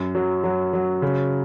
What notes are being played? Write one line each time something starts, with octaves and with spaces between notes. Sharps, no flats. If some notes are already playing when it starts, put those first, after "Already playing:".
Already playing: F#2
F#3
F#3
F#3
C#3